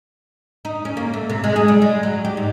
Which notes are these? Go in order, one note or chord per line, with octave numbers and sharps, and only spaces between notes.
D#4
C#4
A#3
A3
C3
G#3
G#4
G3
G#3
F#3
G4
G#2